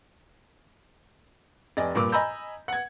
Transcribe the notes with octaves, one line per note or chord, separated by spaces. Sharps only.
F1 D5 D#5 G#5
G2 A#2 A#4 D6
D#5 G#5 A#5 B5 E6 G6
F#5 G#6